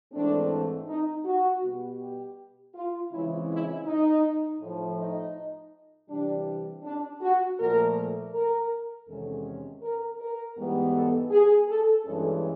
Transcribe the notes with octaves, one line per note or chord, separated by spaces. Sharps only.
G#2 E3 A3 C4 D4
D#4
F#4
B2 G3 B3
G4
F4
C#3 E3 G#3 C4 E4
E4
D#4
A2 F3 A3
D#4
C3 E3 G3 D4
D4
F#4
A#2 F3 A3 A#4
A#4
E2 C3 D#3 G#3 C#4 A4
A#4
A#4
G#2 E3 G3 B3
A4
G#4
A4
G2 E3 G#3 C#4 A4